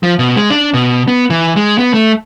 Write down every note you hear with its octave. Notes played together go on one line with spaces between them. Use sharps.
F3
B2
G#3
D4
B2
B3
E3
G#3
B3
A3